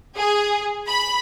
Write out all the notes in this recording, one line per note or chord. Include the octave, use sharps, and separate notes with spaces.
G#4
B5